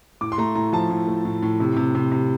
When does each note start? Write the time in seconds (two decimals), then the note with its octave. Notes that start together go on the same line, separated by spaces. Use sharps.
0.21 A2 D6
0.32 C6
0.38 A3 A#5
0.55 A2 A#5
0.73 F3 A5
0.90 A2
1.07 A3
1.25 A2
1.43 A2
1.60 C3
1.77 C3
1.95 C3
2.12 C3